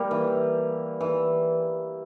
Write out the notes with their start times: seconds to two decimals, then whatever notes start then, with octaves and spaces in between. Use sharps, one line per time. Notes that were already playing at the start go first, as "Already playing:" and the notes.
Already playing: G3 A#3
0.11 E3
1.01 E3